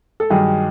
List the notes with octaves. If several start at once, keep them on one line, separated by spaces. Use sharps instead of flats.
A4
G2 D#3 F#3 G#4